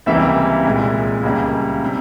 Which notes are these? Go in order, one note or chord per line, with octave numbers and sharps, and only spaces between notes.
C#2 C3 E3 G3 A#3 E5
C2 A#2 G#3
C#2 C#3 G3 A#3
C3